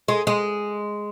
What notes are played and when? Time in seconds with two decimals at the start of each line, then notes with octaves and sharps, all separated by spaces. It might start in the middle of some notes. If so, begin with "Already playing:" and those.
0.08 G#3
0.27 G#3